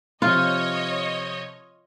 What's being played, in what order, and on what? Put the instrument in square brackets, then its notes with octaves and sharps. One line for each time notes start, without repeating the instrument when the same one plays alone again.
[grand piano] C3 F3 [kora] F4 [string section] C#5 D#5